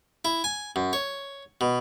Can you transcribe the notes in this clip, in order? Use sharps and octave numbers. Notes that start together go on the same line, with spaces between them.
E4
G#5
F#2
C#5
B2